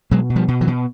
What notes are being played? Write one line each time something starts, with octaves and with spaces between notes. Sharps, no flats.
B2 F#3 G#3
B2
F3 G3
B2
E3 F#3
B2